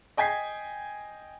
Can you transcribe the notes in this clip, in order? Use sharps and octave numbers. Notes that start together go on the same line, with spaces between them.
D#5 G5 G#5 G#6 B6 C7